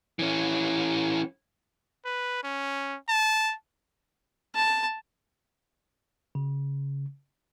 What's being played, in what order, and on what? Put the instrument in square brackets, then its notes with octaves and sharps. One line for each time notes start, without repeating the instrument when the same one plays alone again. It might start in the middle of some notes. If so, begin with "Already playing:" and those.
[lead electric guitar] E3 C#4
[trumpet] B4
C#4
A5
[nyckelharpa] A5
[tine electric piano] C#3